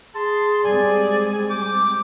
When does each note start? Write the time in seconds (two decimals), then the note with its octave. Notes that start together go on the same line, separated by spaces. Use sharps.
0.15 G#4 A5 C6
0.64 G3 G#3 C4 D5 G#5
1.50 D6 G6